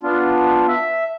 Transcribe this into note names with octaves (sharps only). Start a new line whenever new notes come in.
B3 D4 F4
E5